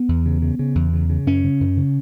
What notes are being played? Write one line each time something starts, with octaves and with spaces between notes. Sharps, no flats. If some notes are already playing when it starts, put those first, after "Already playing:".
Already playing: B3
E2
C#3
C#3
C#3
E2
C#3
C#3
F#2 C#4
C#3
F#2
C#3